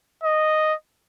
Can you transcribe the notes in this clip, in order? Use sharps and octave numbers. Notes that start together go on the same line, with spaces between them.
D#5